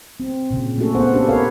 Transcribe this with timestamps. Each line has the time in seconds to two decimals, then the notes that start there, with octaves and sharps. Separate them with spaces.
0.20 C4
0.51 A#2 C#3
0.78 A3 A#3 C#4 F#4 A4
0.95 B3 C5 F#5
1.13 C#4 D4 G4 A4 B4
1.29 A#4 B4 C#5 F5